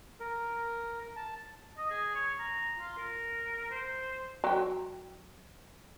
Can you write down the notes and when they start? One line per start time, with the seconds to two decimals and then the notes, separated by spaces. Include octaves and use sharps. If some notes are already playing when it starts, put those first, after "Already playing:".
0.20 A#4
1.16 A5
1.78 D#5
1.90 G#4
2.15 C#5
2.39 A#5
2.79 F4
2.98 A#4
3.71 C5
4.44 F#3 G5